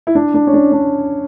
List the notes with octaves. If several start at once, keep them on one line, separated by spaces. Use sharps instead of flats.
E4
D4
D4
C#4
D4
D4